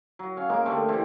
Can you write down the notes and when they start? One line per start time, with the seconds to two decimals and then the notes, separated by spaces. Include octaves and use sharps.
0.19 F#3
0.37 C#4 F5
0.49 G#3 A#3 A#4 D6
0.65 D3 G3 A3 C4
0.89 E3 C4 G4